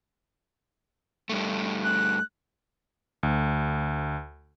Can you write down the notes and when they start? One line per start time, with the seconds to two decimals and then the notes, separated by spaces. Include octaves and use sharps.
1.29 G2 A3
1.84 F#6
3.23 D2